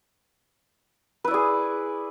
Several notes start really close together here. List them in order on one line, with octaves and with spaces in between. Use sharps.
B4 E4 D5 G#4